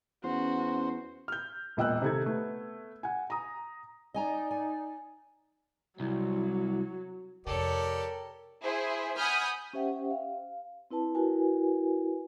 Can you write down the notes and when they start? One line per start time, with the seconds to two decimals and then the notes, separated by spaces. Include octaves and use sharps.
0.24 E2 C#4 F#4 C5
1.28 F6 G6
1.77 E1 A#2 D#5 G5 E6 F#6
2.02 C3 D#3 D#4 A4 G#6
2.26 A3 B3
3.03 F#5 G#5
3.30 A#5 D#6
4.14 D#4 D5 D#5 G#5 A#5
4.51 G#5
6.00 C2 F#3 E4
7.47 F2 C3 G4 A4 A#4 C#5 D5
8.63 E4 G#4 C5
9.17 F#5 G#5 B5 D#6 F6 G6
9.73 C#4 G4 C5 E5 F#5 G5
10.11 F5
10.91 C4 E4 B4 A5
11.15 E4 F#4 A#4 B4 G#5